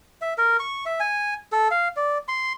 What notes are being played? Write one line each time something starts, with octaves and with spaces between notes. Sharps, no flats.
E5
A#4
C#6
E5
G#5
A4
F5
D5
C6